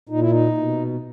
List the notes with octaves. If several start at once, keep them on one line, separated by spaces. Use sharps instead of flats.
A#2 D#4
E4
D#4
B2